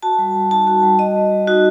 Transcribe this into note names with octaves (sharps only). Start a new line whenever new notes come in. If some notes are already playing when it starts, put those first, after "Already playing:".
F#4 A5
G3
G3
D#4 A5
F#4
G3
F#4 D#5
G3
G3
D#4 F#4